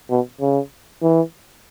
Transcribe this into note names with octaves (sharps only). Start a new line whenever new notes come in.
B2
C#3
E3